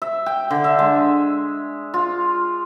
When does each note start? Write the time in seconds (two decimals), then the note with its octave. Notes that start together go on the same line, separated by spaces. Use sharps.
0.02 E5
0.26 G5
0.51 D3
0.64 E5
0.79 G#3
1.94 F4